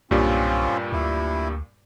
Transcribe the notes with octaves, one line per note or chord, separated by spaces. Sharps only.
B1 G2 A#2 G3 C4 C#4 F4
D2 E4